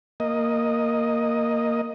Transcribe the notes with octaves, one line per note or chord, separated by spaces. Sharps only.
A#3 D#5